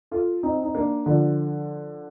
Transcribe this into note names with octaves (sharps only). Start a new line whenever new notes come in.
F4 A4
C4 D#4
D#4
A#3 D4
D3 F3